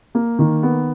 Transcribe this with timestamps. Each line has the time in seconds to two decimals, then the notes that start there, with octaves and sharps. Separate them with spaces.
0.15 A#3
0.39 D#3
0.63 B3